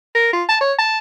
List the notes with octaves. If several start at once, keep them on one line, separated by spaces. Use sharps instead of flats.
A#4
F4
A5
C#5
A5